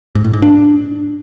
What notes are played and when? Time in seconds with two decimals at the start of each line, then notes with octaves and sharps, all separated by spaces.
0.15 G#2
0.24 A2
0.33 G#2
0.42 D4